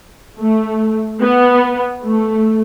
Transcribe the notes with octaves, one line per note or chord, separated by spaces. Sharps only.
A3
B3
A3